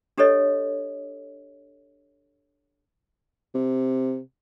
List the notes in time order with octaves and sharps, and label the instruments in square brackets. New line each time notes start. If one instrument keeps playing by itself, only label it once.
[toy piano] D4 G4 A4 C#5 D#5
[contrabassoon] C3